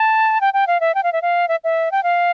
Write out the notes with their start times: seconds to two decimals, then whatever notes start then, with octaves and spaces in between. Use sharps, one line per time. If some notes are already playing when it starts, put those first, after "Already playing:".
Already playing: A5
0.41 G5
0.53 G5
0.67 F5
0.80 E5
0.95 G5
1.03 F5
1.13 E5
1.22 F5
1.48 E5
1.64 E5
1.91 G5
2.03 F5